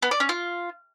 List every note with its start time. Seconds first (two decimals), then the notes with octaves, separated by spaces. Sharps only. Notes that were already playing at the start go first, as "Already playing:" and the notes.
0.02 B3
0.11 D5
0.20 C#4
0.29 F4